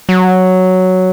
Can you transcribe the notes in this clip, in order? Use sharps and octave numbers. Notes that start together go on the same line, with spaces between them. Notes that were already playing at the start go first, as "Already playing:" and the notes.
F#3